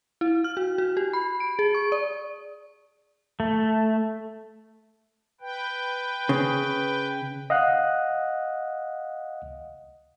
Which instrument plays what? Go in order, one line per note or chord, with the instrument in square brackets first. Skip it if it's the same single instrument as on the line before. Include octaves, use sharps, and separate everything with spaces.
[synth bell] E4
F6
F#4
F#4
G4
B5
D7
G#4
C#6
D5
[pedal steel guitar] A3
[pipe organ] B4 G5
[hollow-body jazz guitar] C#3
[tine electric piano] D#5 F5 F#5 F#6